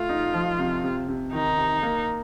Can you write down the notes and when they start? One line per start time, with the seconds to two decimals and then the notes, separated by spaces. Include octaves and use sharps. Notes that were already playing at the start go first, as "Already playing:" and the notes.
Already playing: A3 F4
0.09 D#4
0.34 F3
0.58 C3
0.84 C3
1.08 C3
1.33 D#3 D#4
1.58 C3
1.83 A#3